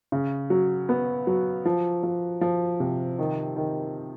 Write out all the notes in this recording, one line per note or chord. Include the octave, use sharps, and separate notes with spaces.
C#3
F#3
B3
F#3
F3
F3
F3
C3
D#3
D#3